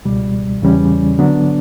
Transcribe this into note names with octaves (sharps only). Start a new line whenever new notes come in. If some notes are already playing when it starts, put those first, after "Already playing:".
C#2 B2 G3
E2 C#3 E3 G3 C#4
D3 F#3 B3 D4